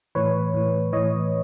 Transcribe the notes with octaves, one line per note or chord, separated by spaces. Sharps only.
A2 E3 B4 C#5
A2 E3
A2 E3 C#5 D#5